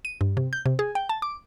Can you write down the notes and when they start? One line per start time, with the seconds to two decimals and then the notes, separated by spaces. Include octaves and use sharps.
0.05 D#7
0.21 G2
0.37 C3
0.53 G6
0.66 C3
0.79 G#4
0.95 G5
1.09 A5
1.22 D6